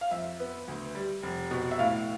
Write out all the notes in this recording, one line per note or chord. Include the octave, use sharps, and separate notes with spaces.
F5
F2 E5
B3
D2
G3
F1
B2
E5
A2 F5